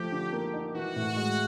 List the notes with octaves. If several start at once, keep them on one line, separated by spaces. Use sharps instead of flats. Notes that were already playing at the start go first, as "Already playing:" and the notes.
Already playing: F3 A3 G4
D3
A#3
D#4
E3 F#4
A2
G#3